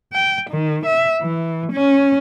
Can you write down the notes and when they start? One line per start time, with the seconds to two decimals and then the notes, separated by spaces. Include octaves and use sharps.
0.13 G5
0.50 D#3
0.86 E5
1.22 E3
1.72 C#4